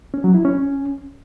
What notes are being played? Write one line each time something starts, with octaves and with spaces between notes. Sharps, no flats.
C#4
F#3
E4
C#4